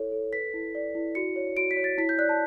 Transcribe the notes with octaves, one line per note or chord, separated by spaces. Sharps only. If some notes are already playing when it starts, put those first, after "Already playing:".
Already playing: E4 A4 C#5
A4
B4 B6
E4
D5
E4
F#4 C#7
C#5
F#4 D7
B6
C#5
A6
E4 B6
G6
D5 F#6
A5